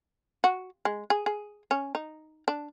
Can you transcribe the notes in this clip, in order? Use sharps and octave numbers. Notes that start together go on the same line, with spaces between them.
F#4
G#3
G#4
G#4
C#4
D#4
D4